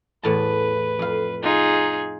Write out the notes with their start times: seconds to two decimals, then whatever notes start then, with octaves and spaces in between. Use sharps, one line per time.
0.23 E2 A2 B4 A5
0.99 F2 F5
1.42 D#4 F4 G#4